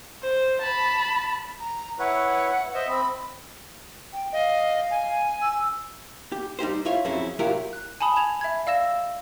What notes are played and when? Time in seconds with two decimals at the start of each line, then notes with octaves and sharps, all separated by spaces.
0.22 C5
0.61 A5 B5
1.60 A#5
1.99 E4 B4 C#5 F#5
2.74 C5 D#5 E5
2.88 C4 B5
4.13 G5
4.33 D#5 F5
4.91 G#5
5.42 E6
6.32 G4
6.59 G3 D#4 G4 C5
6.85 E4 F4 C#5
7.05 F2 F#3 C4 C#4 E4 G#4
7.39 C2 F#3 E4 F4 G4 A#4
7.73 F#6
8.00 G#5 A5 B5 D#6
8.16 G#6 E7 F7
8.41 E5 B5 G#6
8.66 D5 F5 E6 A#6 E7